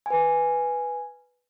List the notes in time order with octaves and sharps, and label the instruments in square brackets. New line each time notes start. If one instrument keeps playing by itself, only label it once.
[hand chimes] B4 G#5